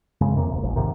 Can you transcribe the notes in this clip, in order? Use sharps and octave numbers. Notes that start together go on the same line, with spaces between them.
F#2 C#3 G#3
E2 C3 A#3
D#1 C2
F1 A#1
G#2 C3 D#3